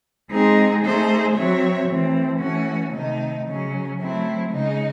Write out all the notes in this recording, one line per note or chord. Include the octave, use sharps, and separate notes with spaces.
G#3 C4 D#4 G#4
A3 D#4 G#4 C5
F#3 C4 F#4 C#5 E5
E3 A3 C4
E3 A3 C#4 F#4
C3 D#3 A3 D#4
C#3 F#3 C#4
F#3 A3 C4 E4
C#3 G#3 D#4